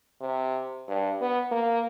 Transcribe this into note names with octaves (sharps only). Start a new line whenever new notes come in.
C3
G2
B3
A#3